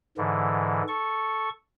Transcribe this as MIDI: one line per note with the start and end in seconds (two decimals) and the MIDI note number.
0.18 0.83 44
0.18 0.83 50
0.18 0.83 52
0.88 1.49 69
0.88 1.49 85